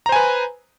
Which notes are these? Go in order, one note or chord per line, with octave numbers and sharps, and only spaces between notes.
B4 C5 G#5 A#5